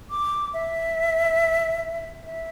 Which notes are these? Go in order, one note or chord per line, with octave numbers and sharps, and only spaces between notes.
D6
E5
E5